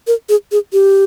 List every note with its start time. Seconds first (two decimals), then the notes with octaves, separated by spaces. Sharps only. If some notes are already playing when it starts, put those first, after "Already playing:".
0.07 A#4
0.29 G#4
0.52 G#4
0.73 G4